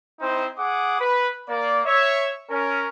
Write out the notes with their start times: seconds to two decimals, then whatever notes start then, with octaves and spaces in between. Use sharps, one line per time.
0.20 C4 D#4 E4 C5
0.58 G#4 F#5 D6 D#6
0.99 B4
1.48 A#3 D5
1.85 C#5 E5
2.50 C#4 A#4